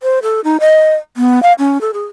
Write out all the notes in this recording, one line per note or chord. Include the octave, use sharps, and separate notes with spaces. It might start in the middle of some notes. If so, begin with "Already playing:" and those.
C5
A4
D#4
D#5
B3
F5
C#4
A4
G#4